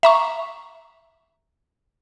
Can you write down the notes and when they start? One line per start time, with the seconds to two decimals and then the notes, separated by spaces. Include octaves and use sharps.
0.03 E5 A#5 C#6